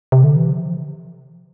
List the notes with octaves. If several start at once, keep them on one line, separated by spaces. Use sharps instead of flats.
C3
D3
E3
F3